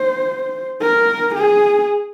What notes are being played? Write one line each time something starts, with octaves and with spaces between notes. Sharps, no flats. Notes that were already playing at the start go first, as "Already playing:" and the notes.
Already playing: C5
A#4
G#4